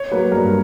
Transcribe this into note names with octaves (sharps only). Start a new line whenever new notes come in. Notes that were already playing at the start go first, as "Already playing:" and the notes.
Already playing: C#5
F#3 A#3 B4
G2 A#4